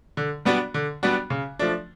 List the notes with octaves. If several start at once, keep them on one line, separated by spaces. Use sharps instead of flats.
D3
G3 B3 D4 F#4
D3
G3 B3 D4 F#4
C#3
F3 A3 D4